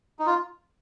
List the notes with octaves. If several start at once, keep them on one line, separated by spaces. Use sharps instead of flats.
D#4
F4